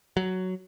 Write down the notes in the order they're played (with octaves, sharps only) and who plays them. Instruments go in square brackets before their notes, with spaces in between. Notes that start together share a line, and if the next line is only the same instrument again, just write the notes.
[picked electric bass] F#3